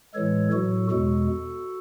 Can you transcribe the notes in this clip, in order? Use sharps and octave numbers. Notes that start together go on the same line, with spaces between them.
A2 E3 G#3 A4 C#5
A2 F#3 F#4 A4
E2 B2 G#3 F#4 A4